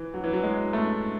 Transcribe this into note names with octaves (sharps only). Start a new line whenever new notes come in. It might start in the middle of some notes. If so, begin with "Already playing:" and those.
Already playing: E3
F#3
E3
F#3
G#3
A3